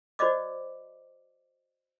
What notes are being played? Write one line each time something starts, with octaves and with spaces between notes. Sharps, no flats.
F#4 C5 D5 D#5 D6